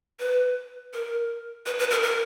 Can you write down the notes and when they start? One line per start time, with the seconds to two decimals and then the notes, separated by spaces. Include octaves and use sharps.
0.19 B4
0.93 A#4
1.66 B4
1.79 B4
1.91 A#4
2.03 A#4